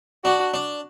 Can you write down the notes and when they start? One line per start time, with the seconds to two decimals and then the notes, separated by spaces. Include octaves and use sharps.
0.24 D4 F#4
0.54 D4